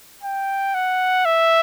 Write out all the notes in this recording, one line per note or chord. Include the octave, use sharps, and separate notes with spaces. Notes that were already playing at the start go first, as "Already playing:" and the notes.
G5
F#5
E5